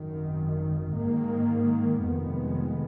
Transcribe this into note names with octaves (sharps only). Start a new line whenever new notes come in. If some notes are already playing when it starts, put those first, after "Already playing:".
Already playing: G#1 F#2 D#3
G#2 D#3 A#3
F1 F2 D#3 G#3 B3